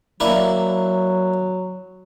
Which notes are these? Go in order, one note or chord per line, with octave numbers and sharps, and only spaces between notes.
F#3 A#3 D4 E4